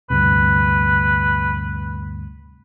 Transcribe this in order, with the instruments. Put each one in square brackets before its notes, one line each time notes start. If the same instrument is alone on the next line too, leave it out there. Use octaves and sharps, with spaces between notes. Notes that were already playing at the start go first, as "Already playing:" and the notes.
[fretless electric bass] D2 G2 C3 [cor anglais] B4